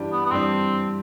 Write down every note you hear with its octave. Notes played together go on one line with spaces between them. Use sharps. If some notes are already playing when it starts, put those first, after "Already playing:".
Already playing: G2 E3 G3 D4
B3
B3
G2 E3 G3 C4 D4